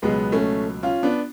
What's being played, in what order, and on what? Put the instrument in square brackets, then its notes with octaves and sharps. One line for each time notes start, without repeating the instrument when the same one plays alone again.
[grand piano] C#2 B2 F#3 G#3 B3
A3 C#4
C#4 F4
B3 D4